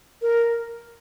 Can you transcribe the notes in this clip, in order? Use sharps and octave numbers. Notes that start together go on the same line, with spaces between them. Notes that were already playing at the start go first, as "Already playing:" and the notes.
A#4